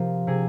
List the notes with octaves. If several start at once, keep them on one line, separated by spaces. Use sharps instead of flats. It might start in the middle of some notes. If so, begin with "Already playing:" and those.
Already playing: C3 F3 A#4
C3 G#4